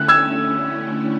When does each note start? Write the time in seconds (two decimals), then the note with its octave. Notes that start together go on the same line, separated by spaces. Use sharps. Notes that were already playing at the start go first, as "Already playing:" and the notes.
Already playing: D3 A3 C#4 E4 F#6
0.08 E6 G#6